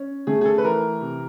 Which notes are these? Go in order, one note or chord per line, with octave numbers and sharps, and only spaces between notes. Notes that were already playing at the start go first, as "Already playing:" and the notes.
Already playing: C#4
A3 G#4
G#4
A4
B4
E3 A#4
C3